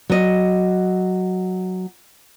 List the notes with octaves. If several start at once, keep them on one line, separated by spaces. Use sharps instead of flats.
F#3 D#5